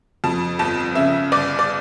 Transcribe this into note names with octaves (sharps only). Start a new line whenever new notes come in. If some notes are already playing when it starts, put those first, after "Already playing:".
F2 A5
G1 A5
C#3 E5
G1 D5
D5